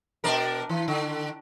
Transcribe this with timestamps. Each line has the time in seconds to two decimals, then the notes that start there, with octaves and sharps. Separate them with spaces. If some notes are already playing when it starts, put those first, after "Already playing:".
0.24 B2 D4 A#4
0.69 E3
0.88 D3